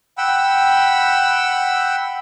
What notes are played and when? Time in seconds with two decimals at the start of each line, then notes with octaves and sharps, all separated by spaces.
0.18 F#5 G5 B5 E6